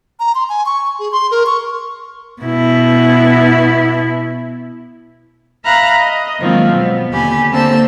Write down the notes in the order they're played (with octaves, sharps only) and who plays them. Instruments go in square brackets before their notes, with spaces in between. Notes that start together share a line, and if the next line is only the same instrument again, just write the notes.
[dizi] A#5
C6
G#5
C#6
G#4
C6
A#4
C#6
[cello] B2 E4
[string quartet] E5 F5 A#5 B5 F#6
D#5
D#3 F3 F#3 G#3 A#3 C4
B2 B3
D#2 D3 G4 G#5 B5
D3 A#3 C4 C5 A5 E6